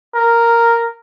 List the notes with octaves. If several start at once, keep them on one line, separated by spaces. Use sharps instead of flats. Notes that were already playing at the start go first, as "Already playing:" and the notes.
A#4